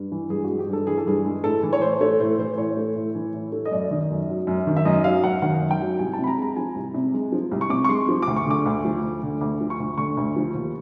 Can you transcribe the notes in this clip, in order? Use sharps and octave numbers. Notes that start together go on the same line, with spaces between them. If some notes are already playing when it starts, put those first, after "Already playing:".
Already playing: G2
E3
G2 G#4
G#3 F#4
G4
G2
A4
E3 G#4
A4
G2 G#4
G#3
A2 A4
E3
C#5
A2 C5
A3 C#5
A2 C5
E3 C5
C5
A2 C#5
A3
A2
E3
A2
A3
D#5
F#2 D5
D#3
F#2
F#3
F#2
D#3
E5
F#2 D#5
F#3 F5
F#2 F#5
D#3 F#5
F#2
G5
F#3
C2 G#5
A5
C3
B5
A#5
G#3 A#5
F3 G#5
C2
C3
G#3
F3
C2
C#6
C3 D6
C#6
G#3 C6
F3
D2 D6
C#6
D3 D6
D2
F3
D2
D3
D2 D6
F3
C#6
D2
D3 C#6
D2
F3
D#2